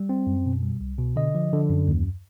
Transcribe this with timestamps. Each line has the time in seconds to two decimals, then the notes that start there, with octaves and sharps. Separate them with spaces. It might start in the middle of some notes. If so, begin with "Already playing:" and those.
Already playing: G3
0.09 C4
0.27 F#2
0.46 B2
0.63 G3
0.81 C2
0.98 B2
1.16 D3 D#5
1.35 F3
1.53 D3
1.70 F#2
1.88 D#2